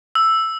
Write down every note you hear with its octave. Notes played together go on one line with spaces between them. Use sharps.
E6